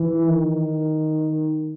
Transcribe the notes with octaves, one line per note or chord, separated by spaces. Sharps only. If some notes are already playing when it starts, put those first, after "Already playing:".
Already playing: E3
D#3